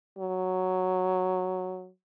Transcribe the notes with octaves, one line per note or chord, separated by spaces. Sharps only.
F#3